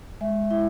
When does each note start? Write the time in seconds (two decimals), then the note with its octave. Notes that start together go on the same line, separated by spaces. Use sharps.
0.21 G#3 E5
0.51 E4 E5